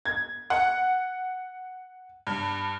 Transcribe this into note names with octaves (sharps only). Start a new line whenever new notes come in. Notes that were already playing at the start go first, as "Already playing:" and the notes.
G#6
F#5
G2